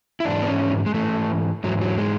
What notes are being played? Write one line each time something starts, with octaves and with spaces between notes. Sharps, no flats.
E4
G#2 E3 D4
B3
C#4
G#3
G#2 E3 A3
G#2 E3 F#3
F#3
G#3